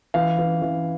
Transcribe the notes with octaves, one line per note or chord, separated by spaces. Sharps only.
E3 F5
E3
E3